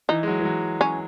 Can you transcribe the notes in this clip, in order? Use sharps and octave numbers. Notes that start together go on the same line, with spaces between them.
E3 D#4
G#3
F#3
E3
F#3
C#4